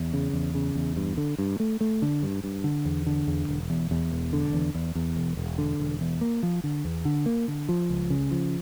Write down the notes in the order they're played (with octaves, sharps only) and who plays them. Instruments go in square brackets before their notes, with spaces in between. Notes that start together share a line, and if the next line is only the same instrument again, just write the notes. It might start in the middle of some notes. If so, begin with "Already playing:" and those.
Already playing: [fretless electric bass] E2
C#3
E2
C#3
E2
G2
D3
G2
A3
A3
D3
G2
G2
D3
E2
D3
E2
E1
E2
E2
E1
D3
E2
E2
E2
E1
E1
D3
E1
E2
A#3
F3
D3
E2
D3
A#3
D3
F3
C#2
C#3
F3